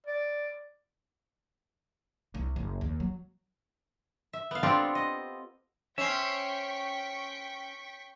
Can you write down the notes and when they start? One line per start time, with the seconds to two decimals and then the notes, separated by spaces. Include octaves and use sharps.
0.06 D5
2.35 C2
2.56 F#1
2.81 D#2
3.00 F#3
4.33 E5
4.51 B3 F5
4.63 C4 D4 F4 G4 A4 D5
4.95 D#5
5.98 C#4 C5 E5 G5 C#6 B6